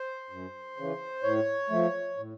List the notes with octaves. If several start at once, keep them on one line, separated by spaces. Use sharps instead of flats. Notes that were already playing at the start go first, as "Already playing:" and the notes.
Already playing: C5
F#2
C#3 E3
A2 C#5
F3 A3
A2